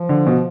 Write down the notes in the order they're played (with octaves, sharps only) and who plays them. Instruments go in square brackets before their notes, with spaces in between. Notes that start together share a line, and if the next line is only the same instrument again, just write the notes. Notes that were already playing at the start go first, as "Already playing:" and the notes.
Already playing: [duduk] F3
[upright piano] D3
B2